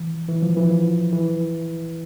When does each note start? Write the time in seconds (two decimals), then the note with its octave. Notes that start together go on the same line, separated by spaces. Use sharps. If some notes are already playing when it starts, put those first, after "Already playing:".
Already playing: E3
0.28 E3
0.42 F3
0.57 E3
0.70 F3
1.12 E3